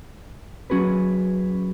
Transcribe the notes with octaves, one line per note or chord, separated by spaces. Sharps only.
F#3 C#4 F#4 G#4 B4